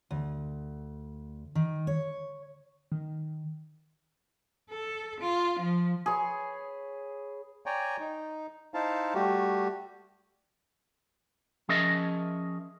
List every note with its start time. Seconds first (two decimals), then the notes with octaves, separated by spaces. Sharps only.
0.11 D2
1.55 D#3
1.87 C#5
2.92 D#3
4.70 A4
5.20 F4
5.59 F3
6.06 G#4 B4 C#5
7.66 C#5 D5 G5 G#5 A#5
8.00 D#4
8.74 D#4 E4 C5 F5 A5
9.14 G3 A3 F#4 G4
11.69 F3 C#4 G#4 A#4 D#5 E5